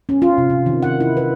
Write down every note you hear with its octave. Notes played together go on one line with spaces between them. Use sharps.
C#4
F4
C3
C3
D#3
F#5
E4
B4